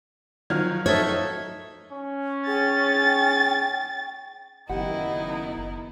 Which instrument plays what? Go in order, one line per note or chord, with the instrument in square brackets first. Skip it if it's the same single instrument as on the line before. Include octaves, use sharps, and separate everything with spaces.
[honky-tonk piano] D#3 F3 G#6 [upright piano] F#3 F6
[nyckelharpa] D#4 E5 [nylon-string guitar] A4 C#5
[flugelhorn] C#4
[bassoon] G#4 [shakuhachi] G5 [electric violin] A6
[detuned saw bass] F#1 [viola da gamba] D#3 B3 E4 [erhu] D#4 [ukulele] G4 F#5